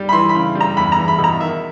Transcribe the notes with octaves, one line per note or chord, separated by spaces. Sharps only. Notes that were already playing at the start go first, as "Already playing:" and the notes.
Already playing: G3
B5
E3 C6
B5
C#3
G3
A#5
E2 B5
A#5
E2
B5
B2
A#5
D#3 E5